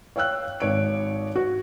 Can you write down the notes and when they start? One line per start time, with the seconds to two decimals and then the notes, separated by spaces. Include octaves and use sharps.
0.16 C#5 F5 G5 E6 F#6
0.60 G#1 C#5 D7
1.36 F#4